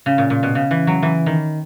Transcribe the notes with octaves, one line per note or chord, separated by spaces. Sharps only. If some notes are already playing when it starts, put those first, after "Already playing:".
C#3
A#2
A#2
B2
C#3
E3
F#3
E3
D#3